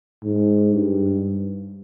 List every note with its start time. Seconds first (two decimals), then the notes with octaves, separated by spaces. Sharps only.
0.23 G#2
0.73 G2